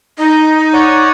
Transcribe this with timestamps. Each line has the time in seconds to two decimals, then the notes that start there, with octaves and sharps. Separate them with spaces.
0.18 D#4 D#5
0.73 C#5 D5 F#5